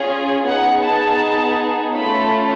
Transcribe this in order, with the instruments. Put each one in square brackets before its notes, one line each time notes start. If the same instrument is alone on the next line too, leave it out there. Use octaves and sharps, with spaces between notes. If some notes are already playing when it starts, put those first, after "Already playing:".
Already playing: [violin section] C#4 F4 G#4
B3 D#4 G#4 F#5
A5
A3 C#4 F4 A4 B5